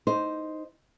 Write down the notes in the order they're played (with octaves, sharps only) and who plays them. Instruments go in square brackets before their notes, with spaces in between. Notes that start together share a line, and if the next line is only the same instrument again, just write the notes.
[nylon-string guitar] D#4 C5